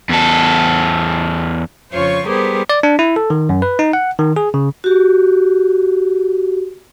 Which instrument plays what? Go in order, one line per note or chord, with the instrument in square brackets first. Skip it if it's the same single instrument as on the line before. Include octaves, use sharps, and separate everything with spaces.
[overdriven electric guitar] E2 A4
[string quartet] F2 C#3 F4 C5 C#5 C#6
G3 B3 G4 G#4 A#4 C5
[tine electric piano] D5
D4
E4
A4
D#3
F#2
B4
D#4
F#5
D#3
G#4
C#3
[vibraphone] F#4 G4